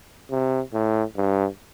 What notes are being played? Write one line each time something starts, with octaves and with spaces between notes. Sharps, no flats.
C3
A2
G2